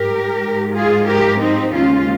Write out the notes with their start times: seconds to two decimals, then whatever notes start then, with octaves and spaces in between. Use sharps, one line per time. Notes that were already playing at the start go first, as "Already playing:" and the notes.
Already playing: G#2 G3 G4 A#4
0.41 G#2 F3 G#3
0.74 F4 G#4
1.08 G4 A#4
1.41 C4 D#4
1.74 D#2 C#3 G#3 C#4 F4